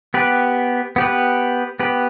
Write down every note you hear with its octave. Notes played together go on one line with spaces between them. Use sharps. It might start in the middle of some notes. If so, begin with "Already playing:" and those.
B3 G4 B4
B3 G4 B4
B3 G4 B4